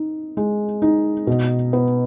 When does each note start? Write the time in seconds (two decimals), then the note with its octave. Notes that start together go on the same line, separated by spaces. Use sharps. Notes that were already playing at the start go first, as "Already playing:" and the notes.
Already playing: D#4
0.37 G#3
0.82 D#4
1.27 B2
1.73 B3